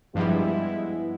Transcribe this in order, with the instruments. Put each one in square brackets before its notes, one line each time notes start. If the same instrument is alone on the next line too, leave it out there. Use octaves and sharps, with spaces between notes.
[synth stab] G2 F3 G3 [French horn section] G#3 B3 E4